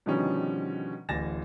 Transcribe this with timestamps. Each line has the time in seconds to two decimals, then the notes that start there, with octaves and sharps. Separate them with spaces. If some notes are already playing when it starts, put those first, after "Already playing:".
0.06 B2 D3 D#3 F3 G3 C#4
1.09 D1 A1 G#5 A6 A#6 E7